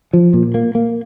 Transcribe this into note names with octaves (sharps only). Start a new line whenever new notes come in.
F3
A#2
A#3
A#3